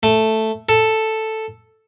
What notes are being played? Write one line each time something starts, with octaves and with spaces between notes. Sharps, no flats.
A3
A4